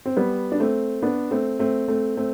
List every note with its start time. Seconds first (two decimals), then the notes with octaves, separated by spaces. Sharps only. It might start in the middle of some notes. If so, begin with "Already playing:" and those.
0.05 C4
0.17 G3 B3
0.52 D4
0.60 A3 C4
1.03 B3 D4
1.31 A3 C4
1.59 A3 C4
1.88 A3 C4
2.17 A3 C4